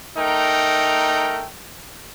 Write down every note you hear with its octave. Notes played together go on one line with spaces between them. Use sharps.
A3 D#4 A#4 G5